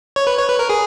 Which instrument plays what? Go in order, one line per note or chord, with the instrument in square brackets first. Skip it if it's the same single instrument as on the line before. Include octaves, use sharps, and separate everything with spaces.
[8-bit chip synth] C#5
B4
C#5
B4
A#4
G#4